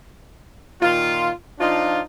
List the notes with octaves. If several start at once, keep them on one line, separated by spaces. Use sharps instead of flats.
A#2 D#3 F4
F3 D4 D#4 F4